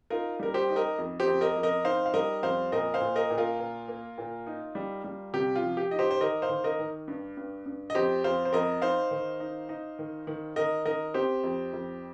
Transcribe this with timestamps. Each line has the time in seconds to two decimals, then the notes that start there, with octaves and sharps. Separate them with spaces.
0.10 D#4 F4 A#4
0.39 G3 A#4
0.54 G4 C5
0.69 D#4
0.76 A#4 D#5
0.98 F2
1.20 G4 C5
1.27 F2
1.41 A#4 D#5
1.56 F2
1.63 A#4 D#5
1.85 D#4 C5 F5
2.06 F5
2.14 G3 A#4 D#5
2.43 F2 C5 F5
2.72 A#2 A#4 D#5
2.94 C5 F5
3.01 A#2
3.16 A#4 D#5
3.30 A#2
3.38 F4 A#4
3.59 A#2
3.88 A#3
4.18 A#2
4.47 D#4
4.75 G3
5.04 G3
5.33 C3 G4
5.55 F4
5.62 F3
5.77 G4
5.91 D#4 D#5
5.99 G4 C5
6.11 C5
6.21 D#3 A#4 D#5
6.42 C5 F5
6.49 D#3
6.64 A#4 D#5
6.79 D#3
7.08 G2
7.37 G2
7.66 G2
7.90 D#5
7.95 F2 G4 C5
8.24 F2 C5 F5
8.45 C5
8.53 F2 A#4 D#5
8.82 D#4 C5 F5
9.11 D#3
9.40 D#4
9.69 D#4
9.99 D#3
10.27 D#3
10.56 D#3 A#4 D#5
10.86 D#3 A#4 D#5
11.14 C4 G4 C5
11.44 F2
11.73 F2